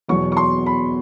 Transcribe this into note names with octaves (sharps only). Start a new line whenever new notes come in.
E2 B2 F#3 C#6
C#6
C6
B5